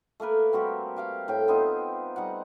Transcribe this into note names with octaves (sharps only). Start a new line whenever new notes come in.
A3 A#3 A#4 B4
G3 C4 F#4 G4
G4 F5 G5
A2 G5
B3 C4 D#4 F4
G3 D#4 F#5